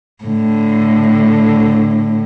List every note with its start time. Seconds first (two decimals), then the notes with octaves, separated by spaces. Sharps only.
0.24 A2 D3